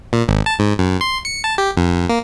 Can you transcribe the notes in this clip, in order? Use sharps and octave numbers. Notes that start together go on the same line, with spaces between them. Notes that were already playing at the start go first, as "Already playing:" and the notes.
A#2
G#1
A5
G#2
F#2
C6
C#7
A5
G4
F2
A#3